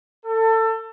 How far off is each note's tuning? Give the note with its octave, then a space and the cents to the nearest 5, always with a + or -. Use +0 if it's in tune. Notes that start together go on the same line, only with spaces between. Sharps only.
A4 +25